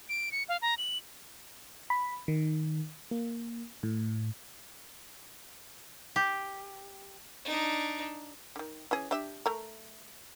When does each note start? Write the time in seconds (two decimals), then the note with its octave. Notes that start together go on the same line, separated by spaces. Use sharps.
0.09 D7
0.32 C#7
0.49 F5
0.62 A#5
0.78 F#7
1.90 B5
2.28 D#3
3.11 A#3
3.83 A2
6.16 G4
7.45 D4 D#4
8.56 D3 D#3
8.91 E3 C#4 G#4
9.11 D4 G4 E5
9.46 A3 A#4